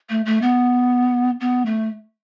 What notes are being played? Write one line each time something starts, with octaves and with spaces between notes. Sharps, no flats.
A3
A3
B3
B3
A3